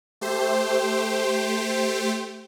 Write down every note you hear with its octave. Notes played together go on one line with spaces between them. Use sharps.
A3 G4 C5